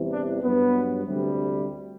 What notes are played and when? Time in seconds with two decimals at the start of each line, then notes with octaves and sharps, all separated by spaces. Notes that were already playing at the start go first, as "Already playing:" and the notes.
Already playing: E2 C3 E3 G3
0.11 D4
0.42 G2 F#3 B3
1.06 D2 C3 G3